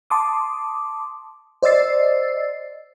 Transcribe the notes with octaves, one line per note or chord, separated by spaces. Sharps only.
A5 C6 D6 D#6
C5 D5 D#5 E6 A6 C7